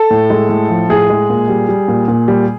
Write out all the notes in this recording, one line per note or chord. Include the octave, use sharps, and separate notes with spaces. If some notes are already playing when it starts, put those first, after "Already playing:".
Already playing: A4
A2
G#3
A2
F3
A2 G#4
G#3
A#2
G3
G3
A#2
A#2
G3